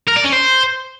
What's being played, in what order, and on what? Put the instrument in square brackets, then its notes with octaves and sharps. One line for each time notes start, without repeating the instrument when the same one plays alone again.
[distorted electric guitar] A#4
D5
C#4
C5